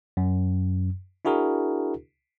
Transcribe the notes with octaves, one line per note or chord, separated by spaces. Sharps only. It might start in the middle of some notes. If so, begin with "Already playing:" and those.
F#2
D4 E4 F#4 G#4 A#4